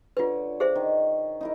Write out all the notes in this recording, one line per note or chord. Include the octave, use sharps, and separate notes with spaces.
D3 F4 B4 C#5
G#4 C5 E5
D#3
D#4 E4 A#4